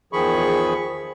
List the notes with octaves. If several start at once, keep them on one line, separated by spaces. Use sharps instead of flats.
E2 D#3 F3 G#4 B5 C#6